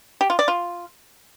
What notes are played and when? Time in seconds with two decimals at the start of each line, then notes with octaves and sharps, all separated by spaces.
0.21 G4
0.30 F4
0.39 D5
0.48 F4